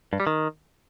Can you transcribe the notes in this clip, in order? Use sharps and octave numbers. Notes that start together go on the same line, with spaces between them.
G2
G3
D#3